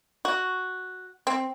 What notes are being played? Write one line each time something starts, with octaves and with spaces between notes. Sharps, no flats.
F#4
C4